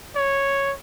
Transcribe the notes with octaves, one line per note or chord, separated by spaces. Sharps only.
C#5